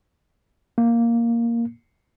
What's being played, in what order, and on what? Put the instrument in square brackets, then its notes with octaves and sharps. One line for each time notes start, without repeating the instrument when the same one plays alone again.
[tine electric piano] A#3